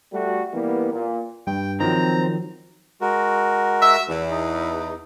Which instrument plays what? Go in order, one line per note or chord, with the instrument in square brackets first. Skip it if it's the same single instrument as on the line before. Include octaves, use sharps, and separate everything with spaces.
[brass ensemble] G3 A3 F#4
E3 G3 A#3 B3
A#2
[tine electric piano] G2 [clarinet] G5
[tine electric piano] D#3 F3 F#3 [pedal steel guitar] C4 [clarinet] A#5
[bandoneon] G#3 F#4 A#4
[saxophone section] E5
E2
[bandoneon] D#4